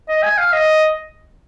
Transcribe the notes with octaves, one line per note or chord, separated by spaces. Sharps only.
D#5
G#5
F5
D#5